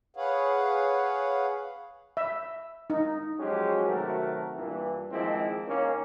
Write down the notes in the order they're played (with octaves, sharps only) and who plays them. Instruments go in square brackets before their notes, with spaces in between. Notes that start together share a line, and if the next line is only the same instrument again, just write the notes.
[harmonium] G#4 B4 C#5 F5 F#5
[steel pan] E5
D#4
[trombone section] F3 F#3 G#3 C#4 F#4 G4
C3 D#3 F#3 A3 F#4 A#4
G2 A#2 E3
D#3 F3 G#3 A#3 C4 E4
D#2 A#3 C#4